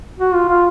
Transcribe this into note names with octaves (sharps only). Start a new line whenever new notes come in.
F#4
F4
F4